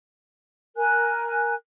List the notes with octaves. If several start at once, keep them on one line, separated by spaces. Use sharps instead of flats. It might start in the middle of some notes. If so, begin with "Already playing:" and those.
A#4 G#5 F#6